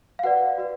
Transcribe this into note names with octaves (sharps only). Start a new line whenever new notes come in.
F5
F#4 B4 D5 F#5
F#4 B4 D5